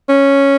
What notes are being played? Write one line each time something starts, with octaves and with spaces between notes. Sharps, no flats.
C#4